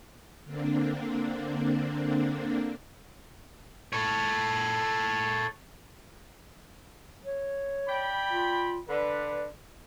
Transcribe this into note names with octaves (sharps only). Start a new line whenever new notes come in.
D3 A#3 C4 D4
A4 C#5
C#5
D5 G5 B5
F4
D3 B4 D5